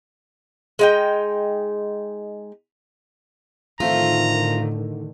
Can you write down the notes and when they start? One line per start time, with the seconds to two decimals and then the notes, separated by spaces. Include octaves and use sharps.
0.79 G#3 D#4 G5
3.80 A2 D3 D#3 F3 A3 C4 F4 A#5